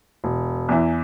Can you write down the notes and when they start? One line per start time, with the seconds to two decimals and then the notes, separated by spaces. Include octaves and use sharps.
0.24 E1
0.69 E2 E3